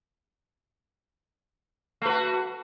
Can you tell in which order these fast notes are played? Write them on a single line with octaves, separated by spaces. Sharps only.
A3 B4 F#4